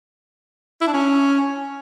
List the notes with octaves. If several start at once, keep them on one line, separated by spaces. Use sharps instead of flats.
E4
D4
C#4